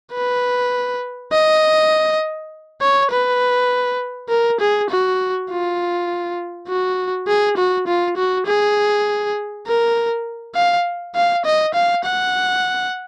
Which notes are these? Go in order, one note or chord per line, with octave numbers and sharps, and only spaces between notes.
B4
D#5
C#5
B4
A#4
G#4
F#4
F4
F#4
G#4
F#4
F4
F#4
G#4
A#4
F5
F5
D#5
F5
F#5